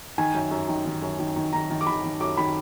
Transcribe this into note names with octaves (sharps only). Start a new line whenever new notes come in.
D#3 G#5
F#2
F#2
D#3
D#3
F#2
D#3
D#3
D#3 A#5
D#3
D6
D#3 B5
D#3
F#2 D6
D#3 B5